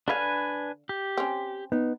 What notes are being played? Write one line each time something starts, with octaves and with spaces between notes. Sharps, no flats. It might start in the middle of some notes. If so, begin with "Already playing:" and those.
D3 D4 B4 F5 G#5
G4
C4 C#4
B3 D#4